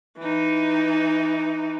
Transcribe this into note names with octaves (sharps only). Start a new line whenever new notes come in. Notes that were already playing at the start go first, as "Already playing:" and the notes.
E3 D#4